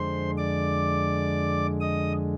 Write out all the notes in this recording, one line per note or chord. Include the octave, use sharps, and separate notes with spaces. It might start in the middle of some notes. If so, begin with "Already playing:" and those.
Already playing: F2 D3 G#3 C5 C6
D5 D6
D#5 D#6